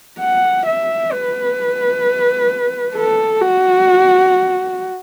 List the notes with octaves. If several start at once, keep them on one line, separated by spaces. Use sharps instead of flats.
F#5
E5
B4
A4
F#4